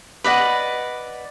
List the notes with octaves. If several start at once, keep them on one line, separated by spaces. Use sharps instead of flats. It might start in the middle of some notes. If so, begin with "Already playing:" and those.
B4 D5 D#5 F#5